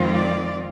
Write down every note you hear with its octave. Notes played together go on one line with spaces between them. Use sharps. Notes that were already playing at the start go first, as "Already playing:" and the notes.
Already playing: F2 D#3 G#3 C4 F4
D5